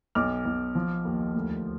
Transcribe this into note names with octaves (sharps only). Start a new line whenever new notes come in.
B1 D6 F6
B1
F3
D#2
D2